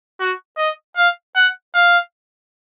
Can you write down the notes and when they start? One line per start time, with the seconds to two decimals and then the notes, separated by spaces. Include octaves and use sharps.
0.20 F#4
0.58 D#5
0.97 F5
1.36 F#5
1.74 F5